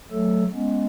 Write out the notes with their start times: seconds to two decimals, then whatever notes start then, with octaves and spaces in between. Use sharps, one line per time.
0.12 F#3 A3 A4
0.53 G#3 B3 C#4